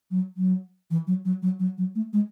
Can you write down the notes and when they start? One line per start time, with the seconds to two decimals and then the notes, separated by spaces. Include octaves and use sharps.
0.11 F#3
0.37 F#3
0.91 E3
1.07 F#3
1.25 F#3
1.42 F#3
1.59 F#3
1.78 F#3
1.95 A3
2.13 G#3